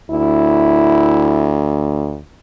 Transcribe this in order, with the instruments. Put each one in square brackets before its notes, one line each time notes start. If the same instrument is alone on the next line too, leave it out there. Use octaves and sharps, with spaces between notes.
[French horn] D2 [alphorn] E4